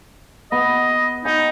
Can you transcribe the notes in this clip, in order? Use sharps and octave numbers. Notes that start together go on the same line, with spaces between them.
B3 D#5
D#4 D#5 G#5